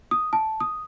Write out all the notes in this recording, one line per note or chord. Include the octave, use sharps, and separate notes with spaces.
D#6
A5
D#6